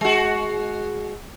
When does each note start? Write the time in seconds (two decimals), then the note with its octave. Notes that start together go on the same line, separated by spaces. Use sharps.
0.01 G#3 F#4